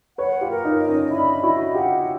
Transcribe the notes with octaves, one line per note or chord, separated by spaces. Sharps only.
B4 C#5 F#5
F4 G4
A#4
D#4 F4
D#5
C#4 D#4
D4 E4 B5
E4 F#4 D#5
F4 G4 F#5